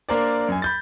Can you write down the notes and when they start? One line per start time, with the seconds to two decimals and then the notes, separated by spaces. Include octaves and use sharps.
0.09 A#3 D4 A#4 C5 D5
0.49 F#2 G#5
0.62 B5 G6 A6